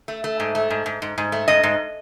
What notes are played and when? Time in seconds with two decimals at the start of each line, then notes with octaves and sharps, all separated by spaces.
0.08 A3
0.24 A3
0.40 G#2
0.55 A3
0.70 G#2
0.86 G#2
1.02 G#2
1.18 G#2
1.32 A3
1.48 G#2 D#5
1.63 G#2